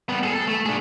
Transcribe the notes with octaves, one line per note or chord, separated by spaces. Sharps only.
G3 B3
G#4 A4
A4
A3
D4 G#4